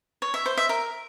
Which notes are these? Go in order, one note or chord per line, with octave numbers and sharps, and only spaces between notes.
C#5
E5
C5
E5
A#4